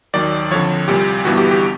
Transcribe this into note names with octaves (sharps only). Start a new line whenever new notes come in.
D#2 D#3 F#3 D5
F2 D3 F3 C#5
C2 A#2 G3 G4
G1 G2 E3 G3 B3 F#4
G4
G4